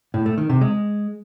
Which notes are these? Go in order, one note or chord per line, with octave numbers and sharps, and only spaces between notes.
A2
A3
D#3
C3
G#3